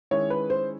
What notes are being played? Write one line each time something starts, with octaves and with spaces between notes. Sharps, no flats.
D#3 G#3 C#4 E4 C#5
B4
C5